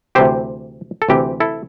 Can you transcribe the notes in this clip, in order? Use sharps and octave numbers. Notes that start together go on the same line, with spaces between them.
D2 C3 E3 C4 G4 C5
A4
D2 C3 E3 C4 G4
E4 A4